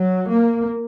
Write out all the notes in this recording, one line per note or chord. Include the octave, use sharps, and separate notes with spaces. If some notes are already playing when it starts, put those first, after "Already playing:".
Already playing: F#3
A#3